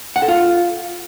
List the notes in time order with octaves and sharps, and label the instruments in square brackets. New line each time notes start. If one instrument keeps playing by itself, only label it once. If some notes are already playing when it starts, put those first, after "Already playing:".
[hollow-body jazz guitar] F#5
A4
F4